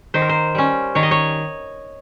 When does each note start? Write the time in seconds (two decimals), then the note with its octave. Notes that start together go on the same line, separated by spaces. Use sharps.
0.14 D#3 C5
0.22 A#4
0.29 C5
0.55 G3 C#4
0.95 D#3 C#5
1.03 D#5
1.11 C#5